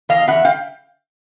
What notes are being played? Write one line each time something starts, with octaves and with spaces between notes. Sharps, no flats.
E2 D#5 F5
E2 E5 F#5
F5 G5